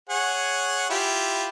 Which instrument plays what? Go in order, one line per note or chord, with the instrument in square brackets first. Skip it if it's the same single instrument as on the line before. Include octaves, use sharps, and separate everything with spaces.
[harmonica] G#4 C#5 F#5
E4 F4 G4